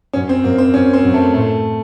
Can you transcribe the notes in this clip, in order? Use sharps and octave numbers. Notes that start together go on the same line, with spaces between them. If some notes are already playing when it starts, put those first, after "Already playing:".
F#2 C#4
C4
F#2 A#3
C4
F#2 C#4
C4
F#2
A3
A2 A3